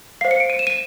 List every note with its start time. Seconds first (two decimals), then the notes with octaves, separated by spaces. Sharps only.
0.21 C5 F5 C7
0.31 C#7
0.40 D7
0.50 D#7
0.59 E7
0.67 D#7